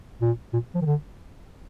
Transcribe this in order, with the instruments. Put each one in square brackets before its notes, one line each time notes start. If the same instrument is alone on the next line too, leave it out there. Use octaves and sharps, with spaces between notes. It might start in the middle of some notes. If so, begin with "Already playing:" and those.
[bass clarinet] A#2
A#2
F3
D#3
D3